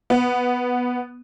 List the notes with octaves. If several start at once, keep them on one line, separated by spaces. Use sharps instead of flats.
B3